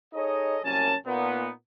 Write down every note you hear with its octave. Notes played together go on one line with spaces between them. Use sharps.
D#4 G#4 A4 C#5 D#5
C2 F#2 A#3 C#4 G#5 A5
A#2 B3 D#4